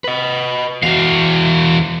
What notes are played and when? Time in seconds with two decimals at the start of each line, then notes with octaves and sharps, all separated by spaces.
0.04 B4 D#5
0.83 E2 E3 F#4 F5